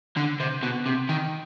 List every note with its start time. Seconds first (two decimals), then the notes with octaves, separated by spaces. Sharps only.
0.17 D3
0.40 C3
0.63 B2
0.86 C3
1.09 D#3